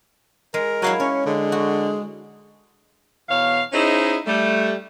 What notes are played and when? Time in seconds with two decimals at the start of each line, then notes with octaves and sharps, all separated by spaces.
0.54 G#3 A#4
0.82 F#3 E4 F5 G#5
1.00 C#4 C#5
1.26 D3 G#3
1.52 F#4
3.29 E2 B2 C#5 F5
3.73 C#4 D#4 E4 G#4 C5 D#5
4.26 G3 A3